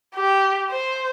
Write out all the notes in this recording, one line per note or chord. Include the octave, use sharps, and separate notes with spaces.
G4
C5